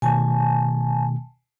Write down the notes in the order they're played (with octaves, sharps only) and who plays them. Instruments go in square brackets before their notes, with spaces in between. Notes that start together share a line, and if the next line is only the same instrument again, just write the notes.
[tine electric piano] B2 D#3 A3 [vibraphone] G#5 A5